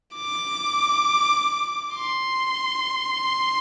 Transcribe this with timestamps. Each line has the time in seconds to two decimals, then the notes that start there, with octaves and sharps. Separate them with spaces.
0.15 D6
1.94 C6